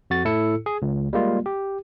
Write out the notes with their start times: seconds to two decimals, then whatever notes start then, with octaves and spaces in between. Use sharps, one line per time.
0.10 F2 F#4 A6
0.25 A2 E4 A4 E6 C#7
0.66 G#4
0.82 C#2
1.13 G3 G#3 A#3 F4
1.46 G4